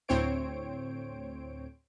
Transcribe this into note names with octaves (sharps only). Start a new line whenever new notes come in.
D2 A2 C4 C5 C#5 D7